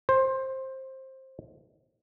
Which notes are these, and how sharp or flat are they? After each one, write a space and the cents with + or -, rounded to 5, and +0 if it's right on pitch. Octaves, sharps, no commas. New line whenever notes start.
C5 +15